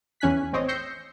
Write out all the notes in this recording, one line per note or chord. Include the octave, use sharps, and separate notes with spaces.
E2 C#4 G#5 F#6 B6
A1 C4 C#5 D#5
E6 G6 A#6 C7 C#7